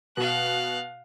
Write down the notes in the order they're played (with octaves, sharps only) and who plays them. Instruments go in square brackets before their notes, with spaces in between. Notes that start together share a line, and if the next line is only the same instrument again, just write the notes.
[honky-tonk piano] B2 [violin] F5 F#6